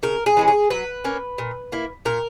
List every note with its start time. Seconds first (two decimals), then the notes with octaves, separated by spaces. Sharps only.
0.03 C#3 A#4
0.26 G#4
0.37 E3 G#3 C#4
0.48 G#4
0.70 F#3 B4
1.04 A#3 C#4
1.38 A#2
1.72 A#3 E4
2.05 A#2 A#4